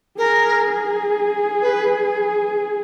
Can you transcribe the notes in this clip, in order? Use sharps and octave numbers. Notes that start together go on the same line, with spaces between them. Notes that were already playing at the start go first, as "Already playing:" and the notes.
G#4 A#4
B4